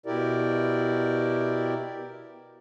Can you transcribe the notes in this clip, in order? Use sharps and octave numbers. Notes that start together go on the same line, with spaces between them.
B2 E4 G4 A#4 D5